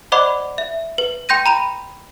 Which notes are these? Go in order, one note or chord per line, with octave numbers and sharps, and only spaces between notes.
C5 D5 D#5 F#5 B5 D6
E5
B4
G5 C6 G6 A#6 D#7
A#5 B5 D#7